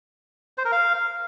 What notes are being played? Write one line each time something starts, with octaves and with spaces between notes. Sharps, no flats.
C5
A#4
F5